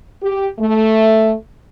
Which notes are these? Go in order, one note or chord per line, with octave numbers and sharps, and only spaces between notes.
G4
A3